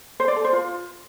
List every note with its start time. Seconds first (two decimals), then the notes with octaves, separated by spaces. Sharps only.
0.20 C5
0.28 D5
0.36 A4
0.44 C5
0.53 F4